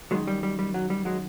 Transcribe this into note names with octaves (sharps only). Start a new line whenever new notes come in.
F#2 D#3 F#3 G#3
G3
G3
G3
F#3
G3
F#3 G#3